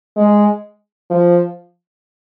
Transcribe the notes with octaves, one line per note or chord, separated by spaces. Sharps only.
G#3
F3